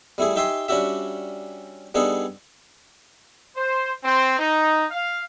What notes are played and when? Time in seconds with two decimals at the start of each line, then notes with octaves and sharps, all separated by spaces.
0.18 G3 A3 E4 G#4
0.36 D#4 G4 E5 G5 G#5 C6
0.68 G3 C#4 D4 F#4 G4 E5
1.95 G3 B3 D4 D#4 G#4 A4
3.56 C5
4.04 C4
4.39 D#4
4.90 F5